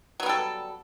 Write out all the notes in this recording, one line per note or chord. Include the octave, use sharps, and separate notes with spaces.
F#3 G3 B3 A4